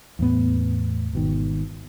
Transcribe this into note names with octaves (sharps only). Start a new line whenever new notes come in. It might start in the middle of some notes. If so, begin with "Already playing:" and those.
E2 A2 B3
G#1 B2 D#3